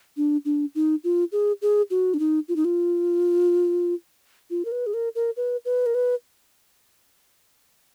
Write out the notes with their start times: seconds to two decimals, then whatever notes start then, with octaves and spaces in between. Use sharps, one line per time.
0.17 D4
0.45 D4
0.75 D#4
1.04 F4
1.32 G#4
1.62 G#4
1.90 F#4
2.14 D4
2.19 D#4
2.48 F4
2.56 D#4
2.65 F4
4.50 F4
4.65 A#4
4.72 B4
4.87 G#4
4.94 A#4
5.15 A#4
5.37 B4
5.65 B4
5.86 A#4
5.95 B4